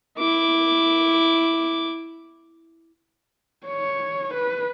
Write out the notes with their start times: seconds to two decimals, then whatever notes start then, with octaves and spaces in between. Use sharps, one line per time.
0.18 E4 D6
3.67 C#5
4.34 B4